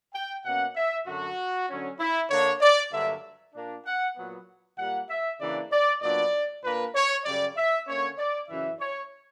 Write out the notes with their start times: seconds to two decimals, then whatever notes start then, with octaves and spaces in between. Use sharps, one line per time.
0.14 G5
0.45 B2 A#3 C#4 F#5
0.76 E5
1.07 F#2 D3 F#3 F#4
1.69 D3 F#3 C#4
1.99 E4
2.30 D3 A#3 D4 C#5
2.62 D5
2.92 G2 D3 F#3 A#3 E5
3.54 A#2 A#3 D4
3.86 F#5
4.16 A#2 F#3 B3
4.78 A#2 G3 A#3 F#5
5.10 E5
5.40 C#3 E3 A#3 D4 D5
5.71 D5
6.02 A#2 F#3 B3 D4 D5
6.63 A#2 A#3 D4 B4
6.94 C#5
7.25 F#2 C#3 G3 D5
7.56 E5
7.87 D3 A#3 C#4 C#5
8.18 D5
8.49 F#2 C#3 E3 E5
8.80 C#5